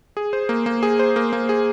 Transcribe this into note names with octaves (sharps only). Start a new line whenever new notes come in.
G#4
C5
A#3
A#3
G#4
C5
A#3
A#3
G#4